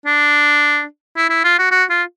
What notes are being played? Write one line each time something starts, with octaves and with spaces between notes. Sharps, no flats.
D4
E4
E4
F4
F#4
F#4
F4